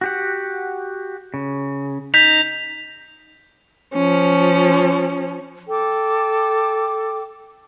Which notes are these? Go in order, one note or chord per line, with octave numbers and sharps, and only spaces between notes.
F#4 G4 F#5
C#3
D#4 G6 B6 F7
F3 C#4
A4 G5 D6